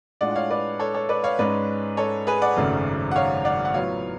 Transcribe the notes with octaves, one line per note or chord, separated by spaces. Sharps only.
A2 G#3 D4 F4 D5 F#5
F#5
C#5 F5
B4 D5
A4 C#5
A4 C#5
B4 D5
C#5 F5
G#2 G#3 C#4 B4 D5
A4 C#5
G#4 B4
D5 F#5
G#1 F#2 C#3 F#3 A3
F#5
C#5 F5
D5 F#5
F#5
A2 F#3 B3 F4 C#5 F5